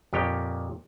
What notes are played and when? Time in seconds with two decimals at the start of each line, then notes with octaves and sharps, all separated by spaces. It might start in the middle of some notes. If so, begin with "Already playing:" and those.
0.13 F2 A#2 G4 C#5 G5